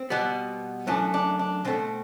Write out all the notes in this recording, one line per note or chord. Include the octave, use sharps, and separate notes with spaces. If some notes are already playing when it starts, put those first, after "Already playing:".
Already playing: C4
B2 G3 B3
F#2 E3 A3 D4
D4
D4
B2 A3 C4